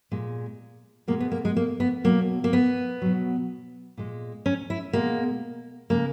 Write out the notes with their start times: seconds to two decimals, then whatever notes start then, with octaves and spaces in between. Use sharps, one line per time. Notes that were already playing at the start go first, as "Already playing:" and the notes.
0.12 A#2 G#3
1.08 B2 G#3 A#3
1.20 B3
1.32 A#3
1.45 G#3
1.57 A#3
1.80 B3
2.04 B2 F#3 A#3
2.44 A#3
2.53 B3
3.02 B2 F#3
3.97 A#2 G#3
4.46 C#4
4.70 E4
4.93 B2 G#3 A#3
5.90 C#3 G#3 A#3